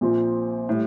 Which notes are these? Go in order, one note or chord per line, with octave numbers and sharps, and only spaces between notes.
A#1 A#2 F3 C4
A2 G3